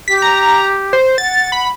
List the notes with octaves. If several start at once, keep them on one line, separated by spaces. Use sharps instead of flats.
G4 B6
A#5
C5
F#5 A6
B5